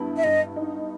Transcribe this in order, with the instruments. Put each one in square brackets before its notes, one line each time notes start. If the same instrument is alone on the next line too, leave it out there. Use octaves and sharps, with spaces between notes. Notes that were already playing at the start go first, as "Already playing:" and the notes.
Already playing: [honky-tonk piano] G2 B3 E4
[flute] E5
[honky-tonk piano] G2 [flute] D#5
[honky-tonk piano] D#4